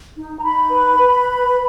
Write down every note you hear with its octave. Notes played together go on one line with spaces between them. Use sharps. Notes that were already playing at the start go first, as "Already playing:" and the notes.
D#4
A#5
D#4 B5
B4
B4